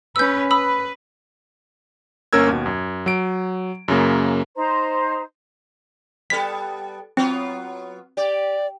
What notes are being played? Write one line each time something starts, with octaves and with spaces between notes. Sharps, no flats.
C#4 B4 E6 G6
B4 B5 D#6 E6
G1 A#3 C#4 A#4 E6 G#6
D#2 B2
F#2
F#3 D7
F#2 C#3 A#3
D#4 C5 A#5
G3 B3 A4 B6
F#3 B3 C4 F4
G4 D5